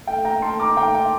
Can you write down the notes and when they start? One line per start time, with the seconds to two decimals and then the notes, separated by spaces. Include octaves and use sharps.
0.07 A3 G5
0.25 G5 A#5
0.42 A3 A5 C6
0.60 A#5 D6
0.77 A3 G5 A#5
0.95 G5